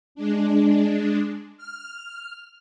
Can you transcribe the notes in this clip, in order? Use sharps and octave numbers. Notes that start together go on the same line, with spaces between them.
G#3 D4
F6